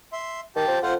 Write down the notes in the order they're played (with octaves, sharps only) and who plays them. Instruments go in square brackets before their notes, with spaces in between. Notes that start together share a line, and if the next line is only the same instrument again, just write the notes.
[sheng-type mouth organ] E5 C6
[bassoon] D#3 [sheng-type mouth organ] G4 G5 A5
[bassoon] F3
[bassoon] F2 [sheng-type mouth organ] F4 C5 F#5